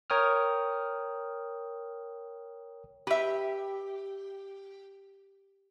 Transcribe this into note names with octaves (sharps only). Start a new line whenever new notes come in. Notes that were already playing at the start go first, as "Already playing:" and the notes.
A#4 C#5 G5 D#6 F6
G4 B4 E5